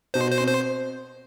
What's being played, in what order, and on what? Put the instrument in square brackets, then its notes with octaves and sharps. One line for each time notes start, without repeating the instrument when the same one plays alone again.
[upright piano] B2 [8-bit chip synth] C5
[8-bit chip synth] C5
[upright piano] C4
[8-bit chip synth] C5